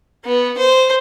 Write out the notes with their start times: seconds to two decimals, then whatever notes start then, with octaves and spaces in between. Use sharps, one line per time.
0.25 B3
0.58 C5